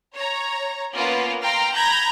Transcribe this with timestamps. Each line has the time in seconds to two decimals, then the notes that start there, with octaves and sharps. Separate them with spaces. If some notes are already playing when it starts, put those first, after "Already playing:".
0.16 C#5 A#5
0.94 A#3 B3 C#4 F4 B4
1.43 F5 G5 A#5 C6
1.74 A#5 B5 G6 G#6 A#6